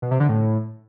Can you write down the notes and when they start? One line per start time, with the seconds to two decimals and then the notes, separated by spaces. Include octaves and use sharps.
0.02 B2
0.11 C3
0.20 D3
0.29 A2